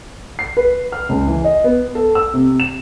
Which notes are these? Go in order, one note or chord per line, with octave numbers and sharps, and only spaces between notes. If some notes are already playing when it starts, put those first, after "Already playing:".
C7
B4
F6
C#2
E3
D#5
B3
A4
E6
C3
E7